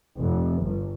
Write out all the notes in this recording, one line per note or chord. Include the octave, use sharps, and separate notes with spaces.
F1
G1